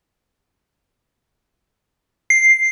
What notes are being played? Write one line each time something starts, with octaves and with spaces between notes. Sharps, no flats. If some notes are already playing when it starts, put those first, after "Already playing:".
C7